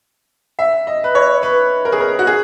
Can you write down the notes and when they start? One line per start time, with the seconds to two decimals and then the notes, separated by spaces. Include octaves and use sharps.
0.59 E5
0.87 D#5
1.04 B4
1.15 C#5
1.43 B4
1.85 A#4
1.92 G#4
2.00 A#4
2.19 F#4
2.27 G#4